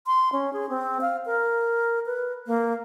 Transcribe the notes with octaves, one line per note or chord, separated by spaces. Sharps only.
C6
C#4
G#4
C4
F5
A#4
B4
A#3